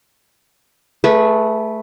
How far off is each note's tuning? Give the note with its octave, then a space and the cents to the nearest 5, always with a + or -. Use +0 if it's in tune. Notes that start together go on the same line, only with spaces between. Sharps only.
A3 +0 G#4 +25 B4 -15